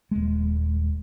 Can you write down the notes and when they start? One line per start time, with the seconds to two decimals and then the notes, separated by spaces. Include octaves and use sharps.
0.11 D#1 G#3